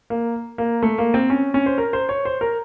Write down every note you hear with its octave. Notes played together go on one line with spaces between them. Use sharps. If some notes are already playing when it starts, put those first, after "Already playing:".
A#3
A#3
A3
A#3
C4
C#4
C#4
C5
A#4
C5
C#5
C5
A#4